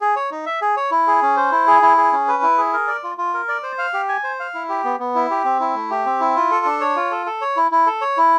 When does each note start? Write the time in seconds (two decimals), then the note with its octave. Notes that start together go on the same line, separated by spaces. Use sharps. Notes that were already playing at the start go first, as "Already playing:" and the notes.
0.01 G#4
0.16 C#5
0.31 D#4
0.46 E5
0.62 G#4
0.77 C#5
0.91 E4
1.07 G#4
1.22 C#4
1.37 C5
1.52 E4
1.67 G#4
1.82 E4
1.97 G#4
2.12 C#4
2.28 B4
2.43 E4
2.58 G#4
2.73 A#4
2.88 D5
3.04 F4
3.18 F4
3.34 A#4
3.48 D5
3.63 C5
3.78 F5
3.94 G4
4.09 G#5
4.24 C5
4.40 F5
4.54 E4
4.69 G4
4.84 B3
4.99 B3
5.15 E4
5.30 G4
5.45 C4
5.60 E4
5.75 A3
5.90 G4
6.05 C4
6.20 E4
6.36 F4
6.51 A4
6.65 D4
6.81 C#5
6.96 F4
7.11 A4
7.26 A4
7.41 C#5
7.57 E4
7.71 E4
7.87 A4
8.01 C#5
8.17 E4